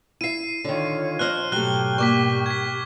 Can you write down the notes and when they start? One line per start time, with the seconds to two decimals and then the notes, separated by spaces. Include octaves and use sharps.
0.21 E4 E5 C7 D#7
0.64 D3 D#3 F4 C#5
1.19 F3 C4 D#5 F6 F#6
1.52 G#2 B2 F#3 A3 G4 G5 F#6 G7
1.98 G3 A#3 C#6 D6 B6
2.46 G#6 B6